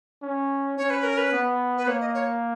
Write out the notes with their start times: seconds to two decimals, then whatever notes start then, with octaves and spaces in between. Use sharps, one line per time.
0.22 C#4
0.77 C#4 C#5
0.90 B4
1.04 A#4
1.17 B4
1.32 B3
1.77 B4
1.87 A#3 C#5
2.00 D#5
2.14 C#5